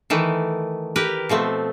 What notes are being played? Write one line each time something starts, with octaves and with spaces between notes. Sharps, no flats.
D#3 E3 A3
G4 A#4 B4
B2 F3 A3 C4